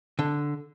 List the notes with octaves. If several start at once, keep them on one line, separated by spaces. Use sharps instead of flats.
D3